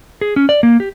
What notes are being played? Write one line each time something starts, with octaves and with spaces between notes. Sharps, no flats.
G#4
C#4
D5
A#3
G4